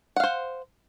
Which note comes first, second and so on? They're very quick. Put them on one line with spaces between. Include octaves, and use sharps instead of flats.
F#5 F5 C5